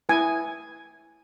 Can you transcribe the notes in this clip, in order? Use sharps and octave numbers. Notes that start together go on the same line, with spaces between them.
E4 B4 G#5